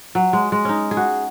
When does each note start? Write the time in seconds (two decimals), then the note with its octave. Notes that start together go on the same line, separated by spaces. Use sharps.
0.15 F#3
0.33 G#3
0.52 G#3
0.65 C#4 D#4
0.91 G#4
0.97 F#4